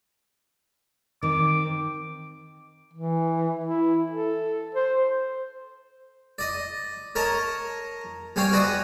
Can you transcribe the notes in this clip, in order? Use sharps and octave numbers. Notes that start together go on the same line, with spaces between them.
D#3 C4 D6
E3
E4
A4
C5
D5 D#5
A#4 C#5 D#5 A5 A#5
G3 C4 C#4 C#5 F5 G5
F#4 B4 D5 D#5 D#6